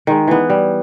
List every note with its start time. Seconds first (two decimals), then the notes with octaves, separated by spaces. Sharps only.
0.07 D#3 G#3
0.28 E3 B3
0.50 G3